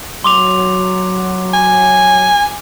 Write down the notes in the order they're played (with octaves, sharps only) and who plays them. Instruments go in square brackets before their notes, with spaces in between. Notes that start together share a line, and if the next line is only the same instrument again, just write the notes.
[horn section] F#3 [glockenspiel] C6 D6 F7
[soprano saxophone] G#5